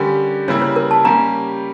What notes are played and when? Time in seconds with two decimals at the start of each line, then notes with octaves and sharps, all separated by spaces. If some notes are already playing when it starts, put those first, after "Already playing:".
Already playing: D3 G3 C#4 G4 A#4
0.48 C#3 G3 A#3 E4 C#5
0.62 C#5
0.76 A#4
0.91 A5
1.05 G3 A#3 C#4 G4 A#5